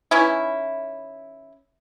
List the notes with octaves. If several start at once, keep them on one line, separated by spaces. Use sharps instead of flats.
E3 C#4 D#4 E4